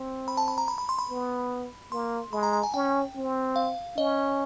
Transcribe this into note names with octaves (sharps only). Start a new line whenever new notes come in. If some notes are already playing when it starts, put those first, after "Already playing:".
Already playing: C4
B5
A5
B5
A#5
B5
B5
C6
B5
B3
A#3 C6
G#3 B5
A#5
A#5
G#5
C#4 G5
C4
F5
C#4 D#5